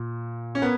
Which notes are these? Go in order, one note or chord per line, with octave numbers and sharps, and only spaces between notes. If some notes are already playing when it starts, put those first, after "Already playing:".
Already playing: A#2
C#4
B3 A#4